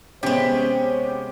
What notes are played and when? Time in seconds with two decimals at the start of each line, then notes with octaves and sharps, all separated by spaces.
0.23 C3 G#3 B3 C#4 G4 C5